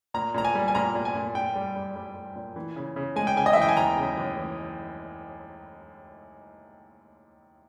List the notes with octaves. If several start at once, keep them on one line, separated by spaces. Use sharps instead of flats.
A#2 A#5
A#2 A#5
G#5
G3
G#5
A#2 A#5
A#2
G#5
A#2
A#2 G5
G3
G3
G3
G3
A#2
E3
C#3
C#3
G#3 G#5
G5
C#3 G#5
D#5
E5
E3
G5
G#5
D#2 A#5
C#3
D#2
E3